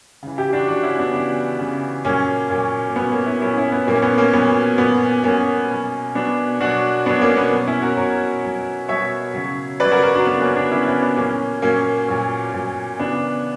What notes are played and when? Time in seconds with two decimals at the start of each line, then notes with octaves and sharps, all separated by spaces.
0.23 C#3 E3
0.38 E4 G4
0.53 D4 F#4
0.68 C#3 E3 D4 F#4
0.83 C#4 E4
0.98 B3 D4
1.14 C#3 E3
1.59 C#3 E3
2.05 A#2 F#3 A#3 C#4
2.50 A#2 F#3
2.89 A#3
2.96 A#2 F#3 B3
3.11 A#3 C#4
3.26 C#4 E4
3.41 A#2 F#3 C#4 E4
3.57 C#4 E4
3.72 B3
3.87 A#2 F#3 A#3
3.95 C#4
4.02 B3
4.18 A#3 C#4
4.33 A#2 F#3 B3
4.78 A#2 F#3 B3
5.24 A#2 F#3 A#3 C#4
5.69 B2 F#3
6.15 B2 F#3 B3 D4
6.60 B2 F#3 D4 F#4
7.06 B2 F#3 B3 D4
7.21 A#3 C#4
7.37 B3
7.52 B2 F#3
7.67 C#4 E4
7.82 F#4 A#4
7.97 B2 F#3 A#4 C#5
8.44 B2 F#3
8.89 B2 F#3 C#5 E5
9.34 C#3 F#3
9.79 C#3 F#3 B4 D5
9.91 F#4 A#4
10.03 F#4 A#4
10.15 D4 F#4
10.26 C#3 F#3 B3
10.40 A#3 C#4
10.56 B3 D4
10.71 C#3 F#3 C#4 E4
10.86 C#4 E4
11.02 B3 D4
11.17 A#2 F#3 A#3 C#4
11.62 A#2 F#3 A#3 C#4
12.08 A#2 F#3
12.54 A#2 F#3
12.99 C#3 E3 B3 D4